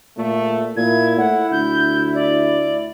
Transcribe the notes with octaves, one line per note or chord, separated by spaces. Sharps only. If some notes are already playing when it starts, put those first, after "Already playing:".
G#1 A#2 A3
A#2 E4 G#6
A2 F#5
D2 G6
D5